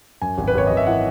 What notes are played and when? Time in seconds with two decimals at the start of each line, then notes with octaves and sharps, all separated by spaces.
0.22 F#2 G#5
0.38 G#1
0.48 B4
0.55 G#1 C#5
0.67 G#1 D#5
0.77 E5
0.87 E3 F#5